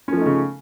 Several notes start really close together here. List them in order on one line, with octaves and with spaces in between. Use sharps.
C#4 F3 A3 D#4 C#3